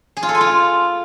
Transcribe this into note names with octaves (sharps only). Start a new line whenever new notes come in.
G#4
F4
A4
G#5
F4